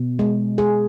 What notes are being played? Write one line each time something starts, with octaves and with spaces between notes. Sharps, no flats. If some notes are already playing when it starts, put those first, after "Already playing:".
Already playing: B2
G#3
G#3 G#4